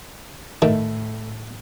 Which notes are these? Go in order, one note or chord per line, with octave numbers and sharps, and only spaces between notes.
A2 D#3 A3